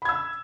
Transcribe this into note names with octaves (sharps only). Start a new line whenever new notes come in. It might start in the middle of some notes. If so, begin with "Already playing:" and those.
B5 E6 G#6